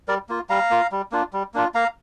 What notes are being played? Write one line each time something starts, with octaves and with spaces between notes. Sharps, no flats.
G3 A#4 D5
A#3 F4
G3 F5 A#5
A#3 F4
G3
A#3 D4 F4
G3
A#3 D4 F4
A#3 F5 A#5